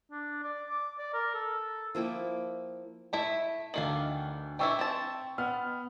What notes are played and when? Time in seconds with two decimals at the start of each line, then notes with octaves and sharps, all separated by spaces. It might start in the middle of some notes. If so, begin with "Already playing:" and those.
0.11 D4
0.43 D5
0.70 D6
0.98 D5
1.13 A#4
1.35 A4
1.95 F3 A#3 E4 G5
3.13 A3 E4 E5 A5
3.74 D2 D#3 A3 D4 F5 F#7
4.59 E3 D4 E4 G5 C#6 E6
4.79 C4 A5
5.38 B3 F6